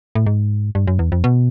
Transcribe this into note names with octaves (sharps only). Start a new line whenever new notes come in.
A2
G#2
G2
F#2
E2
F2
B2